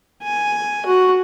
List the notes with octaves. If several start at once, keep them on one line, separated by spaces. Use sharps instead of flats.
G#5
F#4